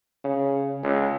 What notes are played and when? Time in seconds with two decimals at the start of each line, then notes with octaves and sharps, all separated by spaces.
0.24 C#3
0.83 C#2